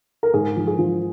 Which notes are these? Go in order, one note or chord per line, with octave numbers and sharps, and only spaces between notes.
A#4
G#2 G#4
F3
G#4
F3